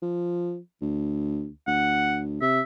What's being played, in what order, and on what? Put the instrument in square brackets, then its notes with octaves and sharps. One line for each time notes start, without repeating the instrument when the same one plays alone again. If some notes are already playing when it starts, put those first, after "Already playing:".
[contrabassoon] F3
D2
[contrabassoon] D2 [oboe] F#5
[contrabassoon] C3 [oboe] E5